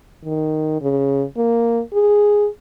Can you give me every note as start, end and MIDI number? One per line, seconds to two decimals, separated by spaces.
0.25 0.77 51
0.82 1.24 49
1.37 1.81 58
1.93 2.47 68